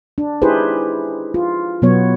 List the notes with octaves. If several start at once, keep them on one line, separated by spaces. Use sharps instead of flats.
D4
D#4 E4 G4 G#4 B4 C5
F4
B2 F#3 B3 C#5